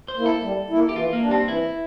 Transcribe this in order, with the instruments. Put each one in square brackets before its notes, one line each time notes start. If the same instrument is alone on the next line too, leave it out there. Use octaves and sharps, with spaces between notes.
[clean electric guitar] C5
[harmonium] A#3 E4
[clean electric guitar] A4
[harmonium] G3
A#3 E4
[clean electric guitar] G4
[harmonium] E3 [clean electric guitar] F4
[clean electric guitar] A#3
[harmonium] G3 D4
[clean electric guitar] C4
[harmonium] E3 [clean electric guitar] E4